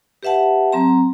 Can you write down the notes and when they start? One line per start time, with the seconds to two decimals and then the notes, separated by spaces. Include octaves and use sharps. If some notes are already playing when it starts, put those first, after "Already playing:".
0.23 G4 B4 E5 F#5 A5
0.73 F#3 C4 A#5